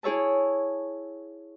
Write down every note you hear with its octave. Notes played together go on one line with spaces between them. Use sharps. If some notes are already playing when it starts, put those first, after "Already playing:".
E4 G#4 C#5 E5 A5